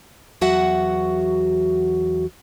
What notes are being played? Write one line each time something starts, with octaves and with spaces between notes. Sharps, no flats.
E2 F#3 F#4 E5 F#5